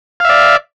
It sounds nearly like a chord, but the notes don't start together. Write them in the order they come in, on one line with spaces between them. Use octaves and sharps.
F5 E5 D5